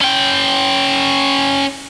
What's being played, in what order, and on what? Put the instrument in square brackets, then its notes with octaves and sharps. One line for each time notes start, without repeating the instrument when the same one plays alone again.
[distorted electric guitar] C#4 G5